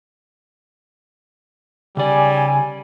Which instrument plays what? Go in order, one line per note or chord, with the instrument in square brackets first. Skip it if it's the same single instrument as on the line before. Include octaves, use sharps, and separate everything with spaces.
[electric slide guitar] C#3 D5 [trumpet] G3 [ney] G#5